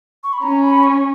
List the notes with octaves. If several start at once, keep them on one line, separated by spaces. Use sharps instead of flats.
C#6
B5
C#4 A#5
B5
C#6